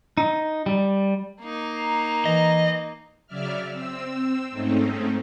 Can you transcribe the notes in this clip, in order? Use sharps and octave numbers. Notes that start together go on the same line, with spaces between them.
D#4
G3
A#3 D#4
E3 D#5
C#3 F#3 D5 E5 F6
C4 E6
G#2 A3 C4 C#4 D#4